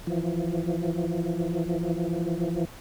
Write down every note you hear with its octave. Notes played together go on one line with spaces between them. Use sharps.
E3 F3